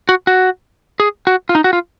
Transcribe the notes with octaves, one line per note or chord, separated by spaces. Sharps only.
F#4
F#4
G#4
F#4
F4
D#4
F#4
F4